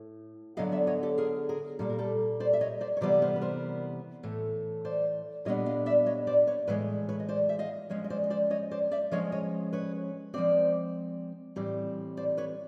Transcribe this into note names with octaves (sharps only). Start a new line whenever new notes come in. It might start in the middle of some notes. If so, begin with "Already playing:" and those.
Already playing: A2
D3 F#3 B3 D#5 F5
D5 E5
C#5 D#5
G4 A4
G#4 A#4
G#4 A#4
A#2 G3 A#3 A4
A#4
G4 A4
C5 D5
E5
C#5 D#5
C5 D5
C#5
C3 E3 G3 B3 C5 D5
A#4 C5
B4
A#4 C5
A2 E3 A3
C5 D5
A#2 G3 B3 D4 C#5 D#5
D#5 F5
D5 E5
C#5 D#5
C5 D5
B4 C#5
A2 E3 G#3 B4 C#5
B4 C#5
D#5
C5 D5
E5
D#5 F5
F3 G#3 C#4 C#5 D#5
D#5
C5 D5
D#5
C5 D5
C#5 D#5
C5 D5
D5 E5
F3 G#3 C#4 C#5 D#5
C#5 D#5
B4 C#5
F3 G#3 C4 C5 D5
A2 E3 G3 C4
C5 D5
B4 C#5